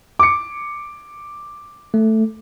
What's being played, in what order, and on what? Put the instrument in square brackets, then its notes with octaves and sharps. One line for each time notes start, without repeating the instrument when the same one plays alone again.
[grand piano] D6 C#7
[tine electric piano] A3